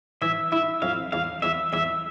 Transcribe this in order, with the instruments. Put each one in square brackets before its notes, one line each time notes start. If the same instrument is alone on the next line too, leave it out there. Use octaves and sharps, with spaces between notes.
[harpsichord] E3 [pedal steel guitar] E5
[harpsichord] E4 [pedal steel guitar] E5
[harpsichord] F2 [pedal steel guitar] F5
[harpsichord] E2 [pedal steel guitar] F5
[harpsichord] E2 [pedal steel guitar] E5
[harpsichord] E2 [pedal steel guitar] E5